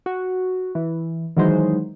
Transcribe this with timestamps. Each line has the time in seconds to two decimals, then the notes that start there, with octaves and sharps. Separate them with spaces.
0.06 F#4
0.75 E3
1.37 D#3 E3 F#3 G#3 D#4 C5